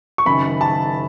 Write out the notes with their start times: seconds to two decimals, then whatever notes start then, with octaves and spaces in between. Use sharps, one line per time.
0.18 C#6
0.26 F#1 F#2 D#3 B5
0.61 A5